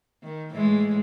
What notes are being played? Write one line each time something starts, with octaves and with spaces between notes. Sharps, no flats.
D#3
A2 E3 G#3